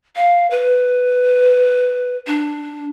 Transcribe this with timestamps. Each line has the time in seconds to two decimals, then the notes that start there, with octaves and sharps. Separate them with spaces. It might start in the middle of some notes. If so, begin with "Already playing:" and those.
0.16 F5
0.51 B4
2.27 D4